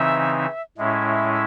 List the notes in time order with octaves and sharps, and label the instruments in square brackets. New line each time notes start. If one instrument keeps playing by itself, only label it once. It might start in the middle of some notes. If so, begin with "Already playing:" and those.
Already playing: [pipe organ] C#3 E3 C4 D#4 [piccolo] E5
[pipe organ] A2 G#3 C#4 E4 [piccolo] E5